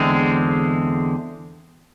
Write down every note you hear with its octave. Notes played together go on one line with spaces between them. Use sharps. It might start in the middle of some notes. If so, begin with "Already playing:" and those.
Already playing: E2 D3 G#3 C4